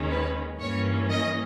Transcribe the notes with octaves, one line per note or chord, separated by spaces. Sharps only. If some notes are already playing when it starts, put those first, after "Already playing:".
Already playing: D#2 D#3 G#3 C#4
B4
G2 E3 A#3 C#4 C#5
D#5